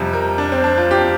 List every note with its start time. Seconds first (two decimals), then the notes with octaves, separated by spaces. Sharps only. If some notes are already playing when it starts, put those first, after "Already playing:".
Already playing: F2 C3 G3
0.13 A#4
0.38 D4
0.52 C4
0.64 D4
0.77 F4
0.91 G4